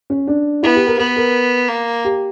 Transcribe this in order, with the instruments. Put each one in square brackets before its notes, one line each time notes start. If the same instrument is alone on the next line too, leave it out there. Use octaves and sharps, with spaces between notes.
[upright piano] C#4
D4
[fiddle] B3 [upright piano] E4
[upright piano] G4
A#4
[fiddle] B3 [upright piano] B4
[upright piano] A#4
[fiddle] A#3
[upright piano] G4